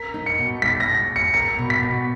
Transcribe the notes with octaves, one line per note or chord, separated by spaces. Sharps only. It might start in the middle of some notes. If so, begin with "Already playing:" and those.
Already playing: A#4 B6
D#4
C#7
B2
G#3 B6
A#6
B2
B2
C#7
A#4 C#7
B2
B6
B2